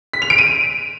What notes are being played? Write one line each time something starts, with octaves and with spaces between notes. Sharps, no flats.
B6
F7
D7
D#7